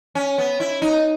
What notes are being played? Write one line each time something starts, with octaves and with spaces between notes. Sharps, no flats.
C#4
B3
E4
D#4